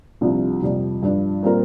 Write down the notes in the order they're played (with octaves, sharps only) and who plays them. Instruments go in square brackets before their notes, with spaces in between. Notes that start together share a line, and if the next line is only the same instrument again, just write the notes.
[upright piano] C2 C3 F3 D4
F2 C3 G3
G2 F3 D4
A#2 G3 C4 A#4